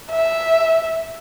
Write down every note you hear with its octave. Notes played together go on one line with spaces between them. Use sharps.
E5